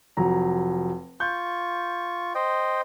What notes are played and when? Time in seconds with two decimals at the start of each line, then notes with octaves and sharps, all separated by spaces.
0.17 F1 F#3 A#5
1.20 F4 C#6 G6
2.35 C5 D#5 G5